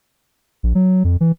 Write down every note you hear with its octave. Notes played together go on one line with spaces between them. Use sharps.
A#1
F#3
F2
E3